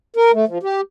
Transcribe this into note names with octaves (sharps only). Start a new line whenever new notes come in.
A#4
A3
F3
G4